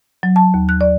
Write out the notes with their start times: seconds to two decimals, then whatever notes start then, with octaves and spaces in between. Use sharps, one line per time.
0.23 F#3
0.36 A5
0.54 D#2
0.69 F#6
0.81 D5